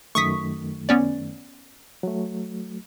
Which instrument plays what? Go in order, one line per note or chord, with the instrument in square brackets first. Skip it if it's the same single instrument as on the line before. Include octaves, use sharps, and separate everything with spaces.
[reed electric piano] F#2 D#3 A3 [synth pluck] C#6 D#6 B6
[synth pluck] B3 C#4 D5
[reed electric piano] F#3 A3